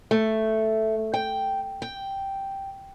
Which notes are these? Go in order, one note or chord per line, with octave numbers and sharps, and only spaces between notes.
A3
G5
G5